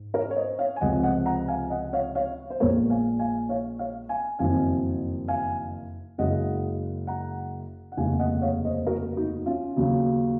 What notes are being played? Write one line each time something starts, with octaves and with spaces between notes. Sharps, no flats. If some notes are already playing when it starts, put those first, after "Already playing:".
Already playing: G#2
A#4 C#5
C#5
C5 D#5
C#5 F5
G#5
C#2 C3 F3 D#5 F#5
D#5 F#5
F#5 A#5
F5 G#5
D#5 F#5
C#5 F5
C#5 F5
C5
A#1 A#2 G#3 A#4 C#5
F5 G#5
F5 G#5
C#5 F5
C#5 F5
F5 G#5
F#1 F2 D#3 F#3 F5 G#5
F5 G#5
F#1 F#2 C#3 G#3 D#5 F#5
F#5 A#5
F#5
F1 D#2 C#3 G#3 F5 G#5
D#5 F#5
C#5 F5
C5 D#5
F#4 A#4
D#4 F#4
C#4 F4
D#2 C#3 F#3